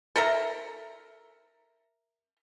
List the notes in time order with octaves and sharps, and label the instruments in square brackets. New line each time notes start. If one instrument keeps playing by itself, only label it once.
[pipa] A4 A#4 E5 A#5